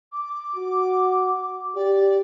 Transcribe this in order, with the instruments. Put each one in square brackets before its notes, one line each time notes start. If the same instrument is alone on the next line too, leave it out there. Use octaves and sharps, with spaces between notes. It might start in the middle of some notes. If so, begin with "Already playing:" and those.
[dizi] D6
[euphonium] F#4
[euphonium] G4 [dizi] D5